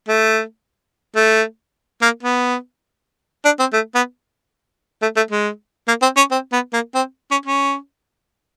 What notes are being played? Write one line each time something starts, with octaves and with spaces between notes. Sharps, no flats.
A3
A3
A#3
B3
D4
C4
A3
B3
A3
A3
G#3
A#3
C4
C#4
C4
B3
A#3
C4
C#4
C#4